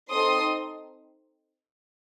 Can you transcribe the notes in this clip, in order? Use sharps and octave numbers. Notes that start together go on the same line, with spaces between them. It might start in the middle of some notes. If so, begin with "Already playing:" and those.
C4 D#4 A4 C6 D#6